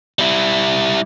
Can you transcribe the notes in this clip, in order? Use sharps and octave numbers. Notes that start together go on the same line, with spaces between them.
G3 E4